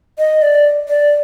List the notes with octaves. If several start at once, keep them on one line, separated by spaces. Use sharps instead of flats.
D#5
D5
D5